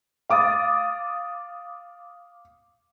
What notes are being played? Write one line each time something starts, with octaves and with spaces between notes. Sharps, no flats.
F5 D6 D#6 A6